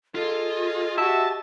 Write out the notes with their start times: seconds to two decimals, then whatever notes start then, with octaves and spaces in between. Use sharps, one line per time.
0.15 F4 G#4 A4 D#5
0.98 F#4 G4 E5 A5